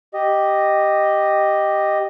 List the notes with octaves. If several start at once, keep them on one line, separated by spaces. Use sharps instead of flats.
G4 D#5